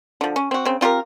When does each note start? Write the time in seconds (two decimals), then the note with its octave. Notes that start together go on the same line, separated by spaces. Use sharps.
0.21 D3 F3
0.36 C#4
0.51 C4 F#4
0.65 C#3 C4
0.81 C4 F4 G4 A#4